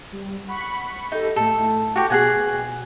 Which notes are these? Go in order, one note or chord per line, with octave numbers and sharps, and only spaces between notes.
G3
F#5 B5 C#6
D#4 G4 A4
A2 A3 A4
F#4 G4
B2 G#4 F#5 G#5